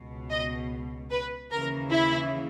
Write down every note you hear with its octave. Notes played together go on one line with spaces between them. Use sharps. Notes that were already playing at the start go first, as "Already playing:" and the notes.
Already playing: C#2 B2
D#5
B4
D#2 C#3 E3 A#4
E4